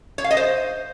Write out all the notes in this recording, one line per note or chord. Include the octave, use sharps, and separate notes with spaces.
C#5
F5
D#5
C5